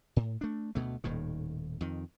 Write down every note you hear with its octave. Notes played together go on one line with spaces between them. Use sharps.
A2
A3 D4
D2 B2 A3
D#1 D#2 A2 D#3
F2 D#3